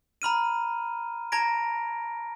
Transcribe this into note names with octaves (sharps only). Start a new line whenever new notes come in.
A#5 B5 F6 D#7
A5 A#5 G#6 A#6 D7